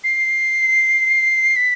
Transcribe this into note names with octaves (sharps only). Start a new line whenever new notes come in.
C7
B6